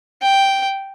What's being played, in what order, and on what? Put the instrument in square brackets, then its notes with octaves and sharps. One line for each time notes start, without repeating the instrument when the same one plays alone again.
[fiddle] G5